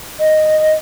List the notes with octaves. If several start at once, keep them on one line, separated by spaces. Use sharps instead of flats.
D#5